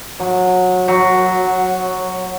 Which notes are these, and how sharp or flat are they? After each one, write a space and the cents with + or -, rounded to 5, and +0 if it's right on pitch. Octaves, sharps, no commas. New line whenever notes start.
F#3 -20
F#3 +0